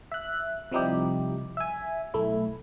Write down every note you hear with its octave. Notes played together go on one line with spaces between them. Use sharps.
E5 F#6
C3 F3 G3 D#4 E4 G4
E5 G#5
B1 A3 E4